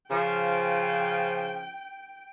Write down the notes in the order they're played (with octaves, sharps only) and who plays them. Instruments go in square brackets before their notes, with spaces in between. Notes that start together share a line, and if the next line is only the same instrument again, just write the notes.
[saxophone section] C#3 F3 [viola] G5